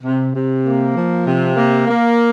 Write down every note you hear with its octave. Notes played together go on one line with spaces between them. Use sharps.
C3
C3
A#3
F3
C3
A#3
A#3